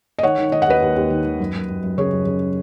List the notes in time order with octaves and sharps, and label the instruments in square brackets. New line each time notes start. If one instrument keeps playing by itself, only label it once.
[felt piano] D#5
D#3 C#5 F#5
D#3
D#3 D#5
F#5
D#2 B4 D#5
D#2
D#2
D#3
D#3
F#2
F#2
F#2
F#2
C#3 G#4 C#5
F#2
C#3